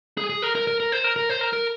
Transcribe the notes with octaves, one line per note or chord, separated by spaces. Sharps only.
G#4
G#4
A#4
A#4
A#4
A#4
C5
A#4
A#4
C5
A#4
A#4